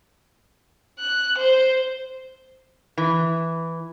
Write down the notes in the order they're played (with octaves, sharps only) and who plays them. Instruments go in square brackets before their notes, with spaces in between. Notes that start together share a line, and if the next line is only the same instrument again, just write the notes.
[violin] F#6
C5
[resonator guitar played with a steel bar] E3